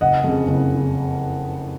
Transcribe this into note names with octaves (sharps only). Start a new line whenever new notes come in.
F#1 D#5 F#5
F2 C#3
F#1
C#3